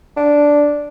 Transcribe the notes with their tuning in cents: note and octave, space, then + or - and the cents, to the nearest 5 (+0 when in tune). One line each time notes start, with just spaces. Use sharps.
D4 -5